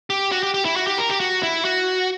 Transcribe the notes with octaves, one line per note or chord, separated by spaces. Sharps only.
G4
F#4
G4
G4
E4
F#4
G4
A#4
G4
F#4
E4
F#4